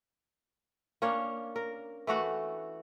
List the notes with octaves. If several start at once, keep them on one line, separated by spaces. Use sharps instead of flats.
A#3 C#4 D4 C#5
A#4
E3 A3 F#4 F#5